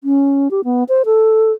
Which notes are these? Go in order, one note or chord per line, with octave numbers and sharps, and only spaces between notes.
C#4
G4
B3
C5
A4